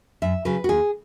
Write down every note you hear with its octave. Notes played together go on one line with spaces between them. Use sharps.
F#2 E5
C#3 F#3 B4
F#4
D#2 G#4